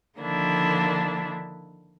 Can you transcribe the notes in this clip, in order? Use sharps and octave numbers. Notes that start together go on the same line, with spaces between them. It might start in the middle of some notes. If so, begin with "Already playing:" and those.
D3 D#3 F3 A#3 D4 E4